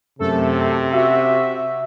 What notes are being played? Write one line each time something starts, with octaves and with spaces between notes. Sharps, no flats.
F#2 C3 A3 A4
F#4 E5